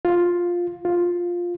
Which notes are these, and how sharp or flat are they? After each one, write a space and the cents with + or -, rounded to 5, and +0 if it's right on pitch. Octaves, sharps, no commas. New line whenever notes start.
F4 +5
F4 +5